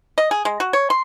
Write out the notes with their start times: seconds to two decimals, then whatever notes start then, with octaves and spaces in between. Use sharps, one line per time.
0.18 D#5
0.31 G#4
0.45 G#3
0.60 F#4
0.73 C#5
0.90 C6